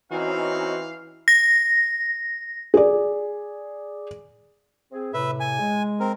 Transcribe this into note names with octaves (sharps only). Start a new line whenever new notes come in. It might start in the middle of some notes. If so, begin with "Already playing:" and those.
E3 C4 C#4 D#4 F#4 F5
A#6
G#4 D5
C4 G#4
A2 C3 B4 E5
G#5
G#3
C4 A#4